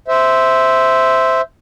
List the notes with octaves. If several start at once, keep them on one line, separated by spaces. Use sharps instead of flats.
C5 E5